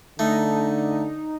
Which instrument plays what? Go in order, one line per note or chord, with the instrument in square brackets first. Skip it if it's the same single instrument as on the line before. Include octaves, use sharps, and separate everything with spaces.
[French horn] D3 [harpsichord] A3 [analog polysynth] D#4